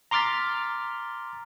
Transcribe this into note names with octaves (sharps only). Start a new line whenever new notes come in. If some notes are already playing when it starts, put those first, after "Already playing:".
A#5 C6 D6 F6 A6 B6